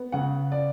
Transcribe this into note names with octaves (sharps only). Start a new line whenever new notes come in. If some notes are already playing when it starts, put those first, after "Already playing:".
Already playing: B3
C#3 F#5
D5